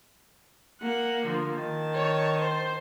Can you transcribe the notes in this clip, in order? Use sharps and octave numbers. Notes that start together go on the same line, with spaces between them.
A#3 F#5
D3 F3
D#3 A5
C#5
C5